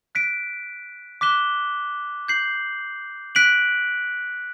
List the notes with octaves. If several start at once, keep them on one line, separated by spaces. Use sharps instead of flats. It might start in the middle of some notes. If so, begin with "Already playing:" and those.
F#6 B6 D7
D6 F#6 B6 E7 G7
G6 C7 F#7
F#6 B6 D7 F#7